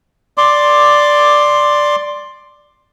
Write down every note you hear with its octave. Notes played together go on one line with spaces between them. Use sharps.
D5 C6 D6